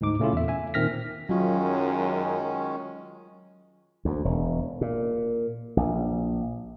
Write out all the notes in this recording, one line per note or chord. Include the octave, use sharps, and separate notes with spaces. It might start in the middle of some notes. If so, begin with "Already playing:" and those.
D2 G#2 D#4 D6
A#2 C#3 A3 C#4 E4 F4
E2 E5
E5 G#5
A#2 D#3 C4 F6 A#6 B6
F#2 D#3 F#3 G#3 C#4 F4
D2
E1
A#2
A#1